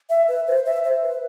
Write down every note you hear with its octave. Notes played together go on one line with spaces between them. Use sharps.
E5
B4
C5
E5
C5
B4